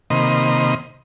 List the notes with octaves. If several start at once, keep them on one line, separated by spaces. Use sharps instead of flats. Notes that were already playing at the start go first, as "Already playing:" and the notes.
C3 D#3 A#3 D#5 B5 C6